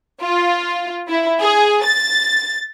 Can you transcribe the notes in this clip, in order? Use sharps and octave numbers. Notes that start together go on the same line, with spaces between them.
F4
E4
G#4
A6